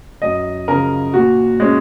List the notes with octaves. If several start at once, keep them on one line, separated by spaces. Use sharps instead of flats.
F#2 D#5
C#3 F3 A#4
A#2 F#4
G#3 C#4